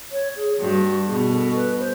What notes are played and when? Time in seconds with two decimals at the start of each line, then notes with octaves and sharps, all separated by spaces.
0.12 C#5
0.36 G#4
0.60 G2 F#4
1.07 B2 G#4
1.32 A4
1.55 B4
1.79 C5